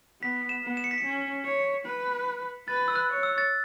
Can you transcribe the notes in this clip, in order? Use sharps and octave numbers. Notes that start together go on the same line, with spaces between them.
B3 B6
E7
B3
E7
C#7
B6
C#7
C#4
C#5
B4
B4 A6
E6
F#6
C#5
E6
A6